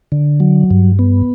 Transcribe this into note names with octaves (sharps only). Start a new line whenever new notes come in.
D3
F#3
G2
B3